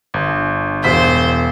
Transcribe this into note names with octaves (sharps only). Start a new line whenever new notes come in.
G1
E1 C5 B6